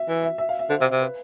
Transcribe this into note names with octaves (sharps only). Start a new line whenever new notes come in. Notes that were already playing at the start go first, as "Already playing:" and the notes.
Already playing: E5
E3
E5
E5
F5
E5
D3 C5
C3
C3
B4